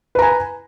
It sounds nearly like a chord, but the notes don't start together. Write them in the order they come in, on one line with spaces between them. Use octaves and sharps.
B4 A#5 G#5